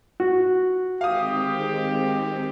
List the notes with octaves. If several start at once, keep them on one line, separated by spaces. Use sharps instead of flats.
F#4
D#3 G#3 C4 G4 F5 D#6